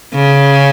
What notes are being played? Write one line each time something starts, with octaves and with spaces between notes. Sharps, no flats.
C#3